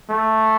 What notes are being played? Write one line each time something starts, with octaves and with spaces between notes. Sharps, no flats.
A3